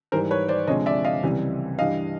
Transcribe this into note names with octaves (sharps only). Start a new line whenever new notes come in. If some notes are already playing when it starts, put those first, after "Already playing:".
G#2 E3 G3 A#4 C5
B4 C#5
C5 D5
D2 C3 F3 G#3 C#5 D#5
D5 E5
D#5 F5
C#2 C3 E3 G3
G2 E3 G3 D#5 F5